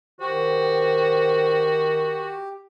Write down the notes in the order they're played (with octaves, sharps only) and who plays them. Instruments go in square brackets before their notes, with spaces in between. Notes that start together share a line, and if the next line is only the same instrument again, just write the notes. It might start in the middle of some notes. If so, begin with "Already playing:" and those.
[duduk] D#3 [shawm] F#4 [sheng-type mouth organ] G4 [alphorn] C5